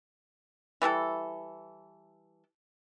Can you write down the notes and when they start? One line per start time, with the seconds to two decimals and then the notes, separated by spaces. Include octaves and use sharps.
0.82 E3 G3 E4 A4